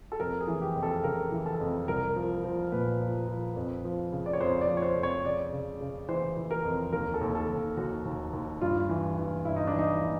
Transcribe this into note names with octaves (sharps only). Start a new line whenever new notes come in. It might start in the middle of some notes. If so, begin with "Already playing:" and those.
A4
F2 A#4
G#4
E3
G4
F2
A4
C#3 A#4
E3
A4
F2
C2 A#4
F3
F3
A#2 B4
F3
F3
F2
F3
C#3
D5
C#5
F2 C5
D5
F3
C#5
C5
F2
C#5
C#3 D5
C#3
C#3
E3 C5
E3
A#4
F2
D#2 A#4
A4
D#2
A4
D#2
D#2 F#4
D#2
D#2
G2 F4
E3
E3
G2 E4
D#4
D4
E3
D#4
E3